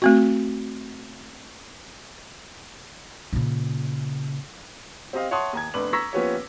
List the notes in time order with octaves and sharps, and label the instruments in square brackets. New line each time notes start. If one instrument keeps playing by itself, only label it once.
[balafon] A3 C4 F#4
[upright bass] A#2 C#3
[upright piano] C4 G4 D#5 F5
C#5 E5 F#5 A5 C6 D#6
D#2 A#5 G#6
F1 B3 D4 B4 D6 F#7
A#5 C#6 E6 G#6 A#6 B6
F3 A#3 B3 C#4 G4 C#5